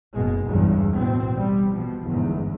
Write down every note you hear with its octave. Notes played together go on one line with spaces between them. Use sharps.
F#1 G#2 B2 G#3
B1 E2 G2 C#3
A1 B2 C4
G3
B2 F3
G1 E2 G#2